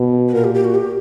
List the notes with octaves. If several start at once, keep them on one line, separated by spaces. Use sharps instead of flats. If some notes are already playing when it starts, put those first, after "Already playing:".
Already playing: B2
B4
A#2 A#4
G4
G4
F#4
G4